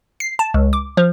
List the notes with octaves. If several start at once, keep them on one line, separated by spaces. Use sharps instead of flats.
C7
A5
C#2
D6
F3